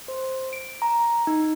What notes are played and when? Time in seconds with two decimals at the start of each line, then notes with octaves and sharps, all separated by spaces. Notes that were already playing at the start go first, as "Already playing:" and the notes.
0.08 C5
0.53 D7
0.82 A#5
1.27 D#4